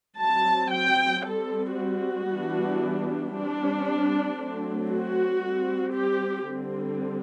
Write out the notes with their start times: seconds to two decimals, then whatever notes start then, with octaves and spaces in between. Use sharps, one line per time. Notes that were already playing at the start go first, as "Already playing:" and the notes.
0.19 F#3 C4 A5
0.72 G5
1.25 G3 C4 A4
1.76 F#4
2.29 E3 G3 B3 D4
3.33 G3 C4 D4
4.38 F#3 A3 C4
4.91 F#4
5.43 G3 C4
5.96 G4
6.48 D3 G3 C4